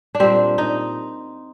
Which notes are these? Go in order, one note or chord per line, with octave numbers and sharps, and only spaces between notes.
D4
A#2 G3 C4
D#4